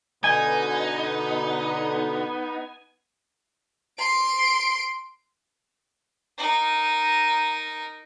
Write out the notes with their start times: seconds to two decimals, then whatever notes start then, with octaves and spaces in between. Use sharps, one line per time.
0.24 B2 D3 B3 D#4 G#5
3.99 C6 D7
6.38 D#4 A#4